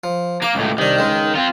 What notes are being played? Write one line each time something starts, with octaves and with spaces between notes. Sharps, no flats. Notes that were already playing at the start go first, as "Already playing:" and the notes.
F3
A#3 D6
C#2 A2
C2 D#3 D4
C#2 G#3
C4 F4